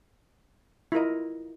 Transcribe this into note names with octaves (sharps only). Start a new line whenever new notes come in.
E4 F4 A#4 D#5